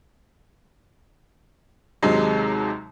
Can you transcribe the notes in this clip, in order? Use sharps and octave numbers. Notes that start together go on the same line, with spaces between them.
D#2 C3 F#3 G#3